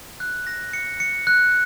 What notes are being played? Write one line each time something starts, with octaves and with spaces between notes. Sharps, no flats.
F#6
A#6
C#7
C#7
F#6